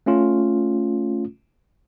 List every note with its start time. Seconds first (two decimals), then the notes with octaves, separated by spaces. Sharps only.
0.06 A3 C#4 F4